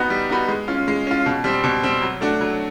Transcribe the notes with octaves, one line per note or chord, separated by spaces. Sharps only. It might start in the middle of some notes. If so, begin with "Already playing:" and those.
Already playing: B3 D#4 F#4 B4
G3
B3 D#4 F#4 B4
G#3
C#4 F4
G#3
C#4 F4
B2
G3 C4
B2
G3 C4
F#3
A3 D4 F#4
F#3